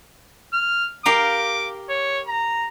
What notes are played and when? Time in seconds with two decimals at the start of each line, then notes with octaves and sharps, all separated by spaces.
0.53 F6
1.06 G4 A#4 F5 D6
1.89 C#5
2.27 A#5